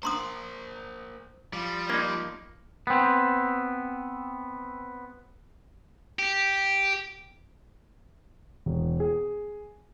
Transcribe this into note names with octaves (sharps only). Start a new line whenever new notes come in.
A#3 C5 A#5 C6 D#6
F3 G3
A#3 D#4 D5
B3 C4
G4
E1
G#4